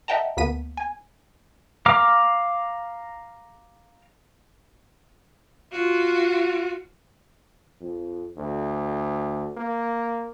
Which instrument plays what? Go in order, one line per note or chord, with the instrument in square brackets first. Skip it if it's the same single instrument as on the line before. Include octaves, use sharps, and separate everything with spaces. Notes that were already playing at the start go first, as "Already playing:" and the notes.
[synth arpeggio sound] D#5 E5 F#5 G5 A5 A#5
D2 A#3 B3 B6 D#7
G#5
[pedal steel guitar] F5 A#5 D6 F6
[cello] F4 F#4
[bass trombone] F2
D2
A#3